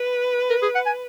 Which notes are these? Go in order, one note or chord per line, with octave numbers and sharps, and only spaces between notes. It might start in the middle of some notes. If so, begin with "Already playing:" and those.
Already playing: B4
A#4
G#4
F#5
G#5